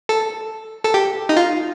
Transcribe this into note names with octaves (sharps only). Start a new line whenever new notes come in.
A4
A4
G4
D#4
F4